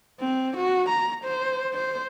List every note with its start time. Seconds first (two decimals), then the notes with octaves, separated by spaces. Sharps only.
0.20 C4
0.57 F#4
0.89 A#5
1.24 C5
1.74 C5